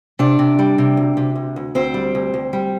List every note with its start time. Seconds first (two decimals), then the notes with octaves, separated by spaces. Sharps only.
0.19 C3 D4 D5
0.39 C3
0.59 G3
0.78 C3
0.97 D2
1.17 C3
1.36 D2
1.56 D2
1.75 D2 C4 C5
1.94 G3
2.15 D2
2.34 D2
2.53 G3